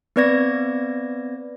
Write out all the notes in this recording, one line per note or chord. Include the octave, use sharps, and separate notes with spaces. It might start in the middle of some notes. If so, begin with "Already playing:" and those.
B3 C4 B4 D5 G#6 A#6